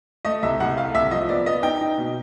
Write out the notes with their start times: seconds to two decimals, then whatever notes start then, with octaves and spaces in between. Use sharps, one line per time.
0.25 A3 D#5
0.43 C2 E5
0.60 C2 F#5
0.77 A3 F5
0.94 C2 E5
1.11 F3 D#5
1.29 B3 D5
1.46 B3 D#5
1.63 D#4 G5
1.81 D#4
1.98 B2